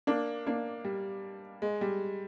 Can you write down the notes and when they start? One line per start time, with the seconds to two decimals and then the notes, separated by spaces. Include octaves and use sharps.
0.07 A#3 D4
0.47 A#3 D4
0.84 G3
1.62 G#3
1.81 G3